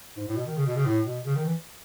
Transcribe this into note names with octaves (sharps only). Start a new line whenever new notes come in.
G#2
A2
B2
D#3
C#3
B2
C#3
A2
B2
C#3
D#3
E3